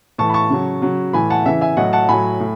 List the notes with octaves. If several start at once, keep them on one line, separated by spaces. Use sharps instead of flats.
A2 E3 A5 C#6
B5
A5 C#6
C#3 F#3
C#3 F#3
A2 E3 G#5 B5
F#5 A5
C#3 E3 E5 G#5
E5 G#5
A2 F#3 D#5 F#5
F#5 A5
A2 F#3 G#5 B5
A2